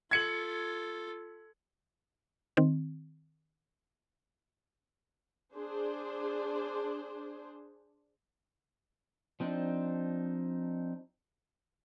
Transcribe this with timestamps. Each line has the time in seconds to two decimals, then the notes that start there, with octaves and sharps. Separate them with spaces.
0.11 F4 A4 G#6 C#7 F#7
2.57 D#3 C4
5.55 D4 G#4 C5
9.40 F3 C4 D4 D#4